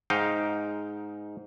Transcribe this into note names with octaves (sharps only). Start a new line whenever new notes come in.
G#2 D#4 F5 G5